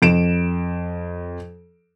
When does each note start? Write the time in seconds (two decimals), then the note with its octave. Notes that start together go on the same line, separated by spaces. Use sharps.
0.02 F2 D7 E7